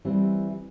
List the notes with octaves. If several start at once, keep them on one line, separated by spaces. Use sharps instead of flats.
E3 G3 C4